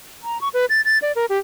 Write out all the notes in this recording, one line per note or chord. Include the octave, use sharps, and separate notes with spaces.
A#5
C#6
B4
A6
A6
D5
A#4
G4